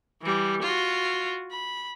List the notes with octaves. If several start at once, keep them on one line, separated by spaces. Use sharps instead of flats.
E3 G3
F4 F#4
B5